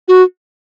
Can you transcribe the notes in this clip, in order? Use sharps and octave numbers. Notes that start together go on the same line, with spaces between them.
F#4